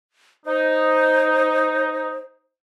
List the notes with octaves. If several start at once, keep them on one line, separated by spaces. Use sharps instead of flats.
D#4 C5